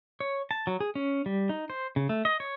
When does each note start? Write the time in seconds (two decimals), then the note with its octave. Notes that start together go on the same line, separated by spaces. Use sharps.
0.20 C#5
0.51 A5
0.67 F#3
0.80 G#4
0.95 C#4
1.26 G3
1.49 D#4
1.70 C5
1.96 C#3
2.09 A3
2.25 D#5
2.40 C#5